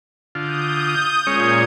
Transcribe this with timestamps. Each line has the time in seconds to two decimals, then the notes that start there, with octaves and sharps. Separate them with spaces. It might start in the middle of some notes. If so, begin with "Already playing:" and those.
0.35 D3 F4 D#6 G6
1.27 A#2 G#3 C#4 C#5 G#6